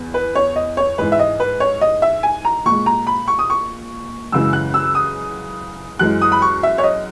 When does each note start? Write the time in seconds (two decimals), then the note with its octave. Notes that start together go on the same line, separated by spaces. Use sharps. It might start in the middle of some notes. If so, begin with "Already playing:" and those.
Already playing: E2
0.14 B4
0.35 C#5
0.56 D#5
0.77 C#5
0.98 G#2 E3 G#3 B4
1.12 E5
1.19 D#5
1.40 B4
1.60 C#5
1.81 D#5
2.02 E5
2.23 G#5
2.45 A#5
2.65 A#2 G#3 C#6
2.86 A#5
3.07 B5
3.28 C#6
3.39 D#6
3.50 C#6
4.32 F#2 C#3 E3 G#3 E6
4.53 F#6
4.74 E6
4.95 D#6
5.99 F#2 E3 G#3 F#6
6.22 D#6
6.32 B5
6.42 C#6
6.63 E5
6.78 C#5
6.84 D#5